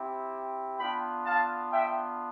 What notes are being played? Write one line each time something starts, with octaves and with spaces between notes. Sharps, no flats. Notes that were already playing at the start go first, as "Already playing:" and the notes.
Already playing: C4 E4 G4
B3 D4 F4 G5 B5
F5 A5
E5 G5